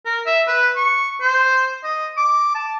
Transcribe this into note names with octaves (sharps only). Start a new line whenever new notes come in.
A#4
E5
B4
C#6
C5
D#5
D6
A5